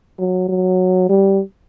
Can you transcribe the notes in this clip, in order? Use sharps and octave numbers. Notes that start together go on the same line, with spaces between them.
F#3
F#3
G3